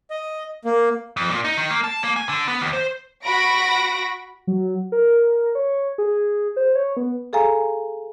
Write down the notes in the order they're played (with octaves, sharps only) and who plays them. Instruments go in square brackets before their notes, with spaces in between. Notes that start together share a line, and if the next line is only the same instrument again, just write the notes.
[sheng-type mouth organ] D#5
A#3
[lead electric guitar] F2
A#2
D#4
D#3
A#3
A5
A#3
G#5
D3
B3
D#2
C5
[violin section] F#4 B5 A#6 D7
[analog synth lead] F#3
A#4
C#5
G#4
C5
C#5
B3
[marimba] G#4 A4 F5 G#5 A#5